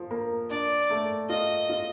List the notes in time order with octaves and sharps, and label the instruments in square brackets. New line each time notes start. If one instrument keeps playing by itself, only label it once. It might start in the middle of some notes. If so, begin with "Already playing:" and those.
Already playing: [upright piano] F3
A#3
[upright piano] D4 [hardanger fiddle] D5
[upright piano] A3
[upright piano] F4 [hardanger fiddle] D#5
[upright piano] F4